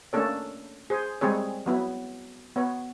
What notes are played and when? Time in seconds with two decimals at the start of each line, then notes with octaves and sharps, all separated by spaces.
0.13 A3 A#3 C#4 D4 A4 C#5
0.90 G#4 C5
1.21 G3 G#3 C4 G#4 C#5
1.66 F#3 B3 E4
2.56 B3 C#5